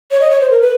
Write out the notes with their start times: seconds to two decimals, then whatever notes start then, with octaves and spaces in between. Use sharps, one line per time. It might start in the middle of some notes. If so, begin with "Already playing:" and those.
0.11 C#5
0.21 D#5
0.30 C#5
0.41 C5
0.51 A#4
0.61 B4